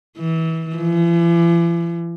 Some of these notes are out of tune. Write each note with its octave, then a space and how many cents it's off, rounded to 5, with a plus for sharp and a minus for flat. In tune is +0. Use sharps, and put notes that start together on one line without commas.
E3 -25
E3 +45